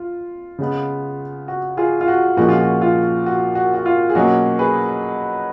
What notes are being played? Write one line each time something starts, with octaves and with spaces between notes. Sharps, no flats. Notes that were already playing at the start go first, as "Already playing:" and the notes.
Already playing: F4
C#3 G#3 B3
F#4
F4 G#4
F4
F#4
A#2 F3 G#3 C#4 F#4
F4
F#4
F4
F#4
F#4
F#4
F4
G#4
B2 F#3 A#3 C#4 F#4
G#4 B4